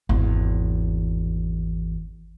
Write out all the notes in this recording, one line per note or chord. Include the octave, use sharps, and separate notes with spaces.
G#1 E2